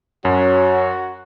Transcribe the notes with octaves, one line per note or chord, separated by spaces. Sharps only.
F#2 F#3 F#4